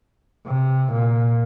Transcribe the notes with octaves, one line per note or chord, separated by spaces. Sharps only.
C3
A#2